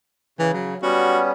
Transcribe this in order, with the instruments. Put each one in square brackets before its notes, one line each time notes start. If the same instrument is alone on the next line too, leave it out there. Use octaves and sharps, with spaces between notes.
[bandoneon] C#3 [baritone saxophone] E3
[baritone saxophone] F#3
[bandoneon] G3 B3 C#4 [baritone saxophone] F#4